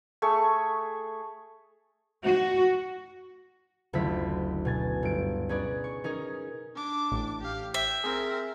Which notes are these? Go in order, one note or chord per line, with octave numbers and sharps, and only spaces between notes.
A3 G#4 C#6
F#4
F#1 D2 E4 F4 B6
B2 G#5 A6
G1 D7
C#4 D#4 G#4 B4 D5
C#6
C#4 D#4 G#4 A#4
D4 D6
A1 A2
G4 F5
E5 G5
C4 G#4 A#4